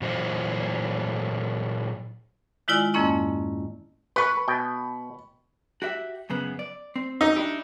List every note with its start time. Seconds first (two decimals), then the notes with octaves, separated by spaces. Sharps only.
0.01 A#2 E3 F#3 C5 D#5 F5
2.68 D#3 G#3 E4 F4 D5 G#5
2.94 F2 G#2 A#3 C#4 E4 D#5
4.16 B4 B5 C#6
4.48 B2 G5
5.82 F#4 G4 E5
6.30 F#2 C#3 B3
6.59 D5
6.96 C4
7.21 D#4
7.36 D4 E4 G4